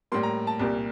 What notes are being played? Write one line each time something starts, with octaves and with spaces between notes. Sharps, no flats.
A2 G3 A#3 C6
A#5
A5
C2 A#2 G3 A#3